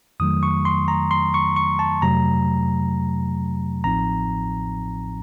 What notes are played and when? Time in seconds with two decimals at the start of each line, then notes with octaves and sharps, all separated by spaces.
0.20 F2 D#3 F#3 A3 D#6
0.43 C#6
0.65 C6
0.88 A#5
1.11 C6
1.34 C#6
1.56 C#6
1.79 A5
2.02 F2 C3 F#3 A3 A#5
3.84 A1 A2 F3 C4 D#4 A#5